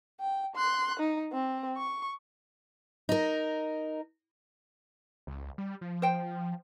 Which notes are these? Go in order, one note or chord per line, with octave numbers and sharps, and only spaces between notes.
G5
C6 F#6
D#4
C4
C#6
D#4 A#4
C#2
G3
F3
C5 G5